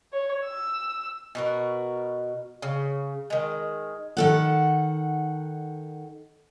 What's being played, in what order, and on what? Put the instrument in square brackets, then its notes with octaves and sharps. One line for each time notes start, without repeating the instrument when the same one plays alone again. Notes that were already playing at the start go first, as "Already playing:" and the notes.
[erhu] C#5
E6
[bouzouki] B2 F#4 A#4
C#3
D#3 G#3
[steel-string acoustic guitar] D#3 A4 F#5